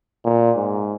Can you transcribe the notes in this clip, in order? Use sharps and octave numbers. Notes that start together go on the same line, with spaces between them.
A#2
G#2